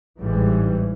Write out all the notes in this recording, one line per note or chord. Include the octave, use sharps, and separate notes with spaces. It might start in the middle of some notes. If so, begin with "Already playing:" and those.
A1 G#2 E3 G3